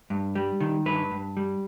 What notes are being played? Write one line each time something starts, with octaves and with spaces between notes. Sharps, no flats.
G2
G3
D#3
G2 B4
G2
G3